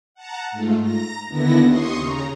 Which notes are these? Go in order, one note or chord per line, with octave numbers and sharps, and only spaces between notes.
F#5 A5 A#5
G#2 A3 F4
A#5 A#6
D#2 D3 B3 E4 A#6
D#2 C6 C#6 D#6
C#3 A#5